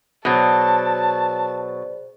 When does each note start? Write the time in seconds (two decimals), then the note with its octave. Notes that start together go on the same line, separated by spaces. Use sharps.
0.25 B2 F#3 G#4 C5 D5 A5